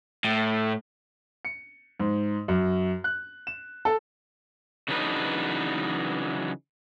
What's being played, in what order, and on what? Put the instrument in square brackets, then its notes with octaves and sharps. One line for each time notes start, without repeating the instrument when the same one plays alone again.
[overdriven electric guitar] A2
[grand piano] C#7
G#2
F#2
F#6
E7
A4
[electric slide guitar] C#3 E3 F#3 D4 D#4 B4